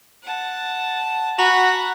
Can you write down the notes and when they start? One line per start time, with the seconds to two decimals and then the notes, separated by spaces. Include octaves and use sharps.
0.23 F#5 A5
1.39 F#4 F#5 G#5 A#5 B5 F7